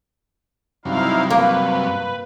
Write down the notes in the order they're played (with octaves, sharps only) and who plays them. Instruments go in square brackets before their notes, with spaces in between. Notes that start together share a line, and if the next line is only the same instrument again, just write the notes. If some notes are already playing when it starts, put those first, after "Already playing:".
[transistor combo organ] G2 C3 F#3 [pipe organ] D#4 E4 F5
[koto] A#3 [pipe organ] B4